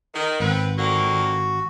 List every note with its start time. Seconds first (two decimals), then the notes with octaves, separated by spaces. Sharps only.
0.14 D#3
0.40 G#1 B3 C4 B4
0.77 F2 D3 A#3 F#4